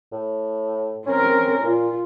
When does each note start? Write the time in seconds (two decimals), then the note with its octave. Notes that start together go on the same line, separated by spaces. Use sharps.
0.12 A2
1.06 C4 C#4 A#4
1.64 A#2 F4